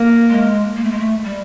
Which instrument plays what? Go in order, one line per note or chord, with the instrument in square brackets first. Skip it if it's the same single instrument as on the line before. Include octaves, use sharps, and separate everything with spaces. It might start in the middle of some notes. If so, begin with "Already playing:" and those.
Already playing: [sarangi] A#3
[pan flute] G#3
A#3
A3
G#3
A3
G3